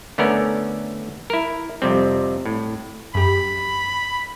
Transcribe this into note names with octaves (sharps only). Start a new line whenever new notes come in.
D3 A3 B3 C#4 A#4 D5
E4 A#4
F2 C3 G3 C4
A2
F#2 G4 B5